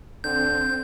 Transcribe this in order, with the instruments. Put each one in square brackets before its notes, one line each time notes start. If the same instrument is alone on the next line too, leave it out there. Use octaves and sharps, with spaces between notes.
[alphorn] D3 [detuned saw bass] C4 [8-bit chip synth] G6